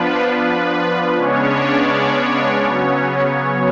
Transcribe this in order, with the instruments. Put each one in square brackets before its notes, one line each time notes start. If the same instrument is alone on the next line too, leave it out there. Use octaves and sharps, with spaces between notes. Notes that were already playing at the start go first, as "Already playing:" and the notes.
Already playing: [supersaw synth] F3 B3 D4 F4 B4
B4
C#3 G#3 B3 C#4 D4 C#5
D4 D5
C#4 C#5
C#3 F#3 B3